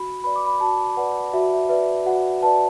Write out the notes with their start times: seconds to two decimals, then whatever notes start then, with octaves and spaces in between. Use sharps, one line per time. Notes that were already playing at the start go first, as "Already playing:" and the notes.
Already playing: F#4 B5
0.24 B4 D5 B5
0.36 D6
0.46 B5
0.60 F#4 A5
0.97 B4 D5 F#5
1.33 F#4 E5
1.54 E5
1.69 B4 D5 E5
2.06 F#4 F#5
2.42 B4 D5 A5